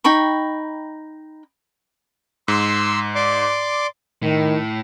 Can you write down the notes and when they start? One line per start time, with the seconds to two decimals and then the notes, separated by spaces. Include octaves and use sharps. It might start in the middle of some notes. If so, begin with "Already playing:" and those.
0.04 D#4 G5 B5 C#6
2.48 G#2 C6 E6
3.15 D5 C6 D6
4.22 A2 D#3